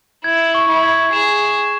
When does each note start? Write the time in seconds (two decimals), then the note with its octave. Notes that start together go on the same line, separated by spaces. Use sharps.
0.24 E4 G#6
0.55 C#6
0.69 E4
0.83 G#6
1.13 G#4 E7
1.42 E7